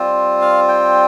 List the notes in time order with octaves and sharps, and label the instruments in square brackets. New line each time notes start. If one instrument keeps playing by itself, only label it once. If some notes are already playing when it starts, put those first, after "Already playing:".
Already playing: [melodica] G3 C4 F4
F5
G5